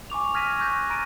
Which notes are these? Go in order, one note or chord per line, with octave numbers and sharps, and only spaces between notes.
G#5 C#6 D6 F7
E6 F6 G#6 A#6 B6 D#7
C#6 F#6 G6 A#6
A#5 F6 A6 A#6 D7 D#7